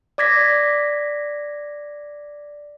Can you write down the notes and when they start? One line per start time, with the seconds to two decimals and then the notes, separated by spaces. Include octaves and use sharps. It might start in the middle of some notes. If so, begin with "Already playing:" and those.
0.18 D5 D6 G#6 A#6 B6